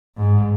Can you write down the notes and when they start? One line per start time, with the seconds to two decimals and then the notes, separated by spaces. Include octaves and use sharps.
0.17 G#2